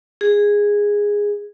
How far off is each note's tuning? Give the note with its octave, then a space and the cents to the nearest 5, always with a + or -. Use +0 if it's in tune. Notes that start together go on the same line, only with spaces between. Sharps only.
G#4 -10